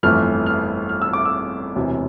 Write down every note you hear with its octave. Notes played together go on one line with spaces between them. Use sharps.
G1 F2 E3 A3 F6
F6
F6
E6
D6
E6
E1 D2 C3 E3